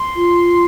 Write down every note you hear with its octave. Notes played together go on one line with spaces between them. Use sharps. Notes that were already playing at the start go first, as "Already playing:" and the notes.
Already playing: C6
F4